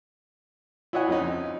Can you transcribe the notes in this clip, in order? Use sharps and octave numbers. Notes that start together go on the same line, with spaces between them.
E4 F4 C#5 D#5 F#5 G#5
F2 F3 C#4 D#4